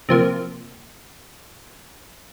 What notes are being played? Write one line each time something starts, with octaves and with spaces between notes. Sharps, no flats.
C3 F3 A#3